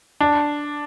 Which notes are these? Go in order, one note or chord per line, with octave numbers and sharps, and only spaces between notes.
D4